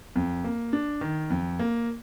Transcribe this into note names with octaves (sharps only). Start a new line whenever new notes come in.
F2
A#3
D4
D#3
F2
A#3